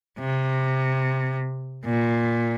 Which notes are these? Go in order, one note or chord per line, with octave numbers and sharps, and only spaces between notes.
C3
A#2